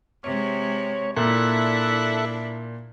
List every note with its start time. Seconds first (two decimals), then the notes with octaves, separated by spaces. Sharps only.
0.24 C3 G#3 C#5
1.17 A#2 D4 E4 A4 E5 F#6